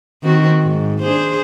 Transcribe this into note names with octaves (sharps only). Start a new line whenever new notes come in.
D#3 C4 F#4
G#2
D4 G#4 C5